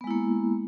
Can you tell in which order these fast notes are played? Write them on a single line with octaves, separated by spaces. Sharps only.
B3 G#3 E4 A#3